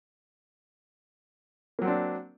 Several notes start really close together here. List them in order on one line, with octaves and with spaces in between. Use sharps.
A#3 F#3 C4 D4